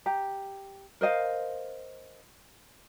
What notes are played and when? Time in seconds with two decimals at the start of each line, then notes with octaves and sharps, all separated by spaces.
0.06 G4 A#5
1.01 A#4 C5 D#5 F5